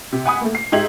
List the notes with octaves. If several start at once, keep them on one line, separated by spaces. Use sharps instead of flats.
C3
F#5 G#5 B5 D#6
A3 A#3
C7
G#2 D#4 G4 E5 G#6 F#7